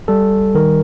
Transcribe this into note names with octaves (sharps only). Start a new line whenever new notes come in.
G3 A4
D#3 A#4